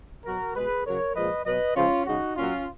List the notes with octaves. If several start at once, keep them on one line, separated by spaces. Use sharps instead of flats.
B2 F#3 F#4 A#4
B2 G#3 G#4 B4
C#3 F#3 A#4 C#5
A#2 F3 G#3 B4 D#5
B2 F#3 B4 D#5
C#3 F3 G#3 C#4 F4
C#3 G#3 D#4 F#4
A#2 F#3 C#4 F4